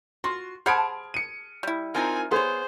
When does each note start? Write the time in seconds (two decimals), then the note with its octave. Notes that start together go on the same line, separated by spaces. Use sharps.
0.24 F4 F#4 C6
0.66 G#4 C5 F#5 A5 B5 F6 G#6 D7
1.14 C#7 D#7
1.63 G3 E4
1.95 C4 D#4 F4 A#4 G#5
2.31 B3 G#4 C5 C#5 C6